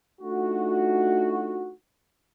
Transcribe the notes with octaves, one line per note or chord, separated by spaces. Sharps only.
A3 D4 D#4 F4 F#4